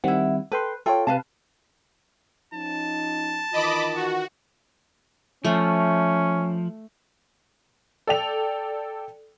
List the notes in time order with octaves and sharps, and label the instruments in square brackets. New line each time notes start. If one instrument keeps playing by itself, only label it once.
[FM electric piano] D#3 G3 C4 [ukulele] E4 F#5
[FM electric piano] A4 G5 C6 [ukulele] B4
[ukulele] F4 G5 [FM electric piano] A4 C#5
[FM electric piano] C3 [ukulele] B4 F5 A5
[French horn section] F3 C#4 D#4 [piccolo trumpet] A5
[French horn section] D#3 E3 F4 [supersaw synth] D#5 B5 D6
[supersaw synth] F#4
[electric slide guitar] F3 [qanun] A3 [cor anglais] C#4
[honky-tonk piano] A4 D5 G5 F7